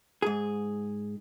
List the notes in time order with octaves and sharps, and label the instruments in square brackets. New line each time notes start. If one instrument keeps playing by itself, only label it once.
[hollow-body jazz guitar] G#2 G#4